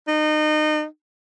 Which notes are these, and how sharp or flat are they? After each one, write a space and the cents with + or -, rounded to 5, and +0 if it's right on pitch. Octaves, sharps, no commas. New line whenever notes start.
D#4 -30